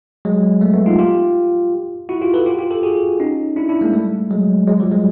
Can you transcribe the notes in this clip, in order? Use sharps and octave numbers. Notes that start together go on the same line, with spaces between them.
F#3 G#3
G3 A3
A3 B3
D#4 F4
F4 G4
E4 F#4
F4 G4
A4 B4
F4 G4
F4 G4
G4 A4
F#4 G#4
C#4 D#4
D4 E4
D4 E4
G#3 A#3
G3 A3
F#3 G#3
F#3 G#3
F3 G3
F#3 G#3